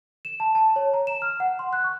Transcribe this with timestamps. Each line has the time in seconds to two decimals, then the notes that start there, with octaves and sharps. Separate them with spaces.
0.25 E7
0.40 A5
0.55 A5
0.76 C#5
0.94 A#5
1.07 E7
1.22 F6
1.40 F#5
1.59 C6
1.73 F#6
1.84 C#6